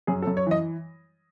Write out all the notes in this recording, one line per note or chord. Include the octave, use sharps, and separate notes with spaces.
F#2 G#4
A4
F#2
C#5
E3 D#5